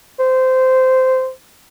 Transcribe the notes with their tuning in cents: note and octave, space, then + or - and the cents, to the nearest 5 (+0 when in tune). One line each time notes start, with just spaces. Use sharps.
C5 -15